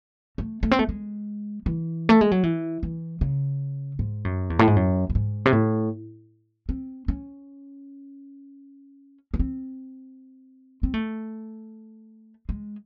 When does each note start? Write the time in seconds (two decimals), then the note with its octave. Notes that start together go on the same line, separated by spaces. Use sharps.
0.38 A3
0.63 A3
0.71 C4
0.79 A3
0.89 G#3
1.66 E3
2.09 A3
2.21 G#3
2.31 F#3
2.43 E3
2.83 E3
3.21 C#3
3.99 G#2
4.25 F#2
4.50 E2
4.59 A2
4.67 G#2
4.76 F#2
5.10 F#2
5.15 G#2
5.45 C3
5.53 A2
6.69 C4
7.08 C#4
9.34 C#4
9.40 C4
10.83 C4
10.94 A3
12.49 G#3